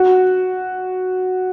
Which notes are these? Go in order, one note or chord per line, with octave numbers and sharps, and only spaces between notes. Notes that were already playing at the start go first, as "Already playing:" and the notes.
Already playing: F#4